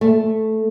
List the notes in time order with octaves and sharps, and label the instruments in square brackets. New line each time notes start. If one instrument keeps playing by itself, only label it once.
[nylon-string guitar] A3